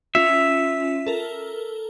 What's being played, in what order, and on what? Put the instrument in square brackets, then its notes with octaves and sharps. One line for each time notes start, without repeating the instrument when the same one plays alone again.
[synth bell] C#4 F4 [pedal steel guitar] E5
[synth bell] A4 A#4